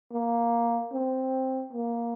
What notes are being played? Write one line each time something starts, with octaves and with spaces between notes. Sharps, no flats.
A#3
C4
A#3